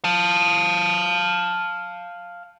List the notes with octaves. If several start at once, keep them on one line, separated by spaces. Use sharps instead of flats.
F5 A5